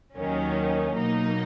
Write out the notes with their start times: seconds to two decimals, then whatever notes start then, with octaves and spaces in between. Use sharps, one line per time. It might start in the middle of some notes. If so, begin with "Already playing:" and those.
0.16 D#2 D#3 F#3 C#4
0.95 B2 F#3 A#3 D#4